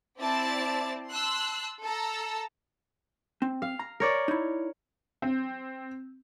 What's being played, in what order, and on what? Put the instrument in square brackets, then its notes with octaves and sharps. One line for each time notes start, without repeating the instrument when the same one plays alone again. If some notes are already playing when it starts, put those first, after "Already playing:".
[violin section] C4 E4 D5 A5 A6
A5 C6 E6 F#6
A4 A5 A#5 E6
[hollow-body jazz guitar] C4
[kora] F5
[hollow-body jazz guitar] A#5
[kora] A#4 C#5 D5
[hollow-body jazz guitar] D#4 E4
[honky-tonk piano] C4